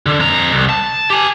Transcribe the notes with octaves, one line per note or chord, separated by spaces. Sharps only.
D3
F2 A#5
C2
A5
G4 G#5